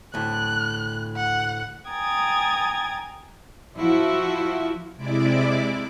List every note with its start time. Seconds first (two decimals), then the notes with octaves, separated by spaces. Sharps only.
0.14 D2 A2 F#6
1.16 F#5
1.88 G5 G#5 A#5 D#6 G#6 A6
3.77 F3 E4 F#4
4.96 C3 G#3 E4 D5 D6